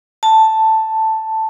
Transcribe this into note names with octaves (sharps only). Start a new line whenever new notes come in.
A5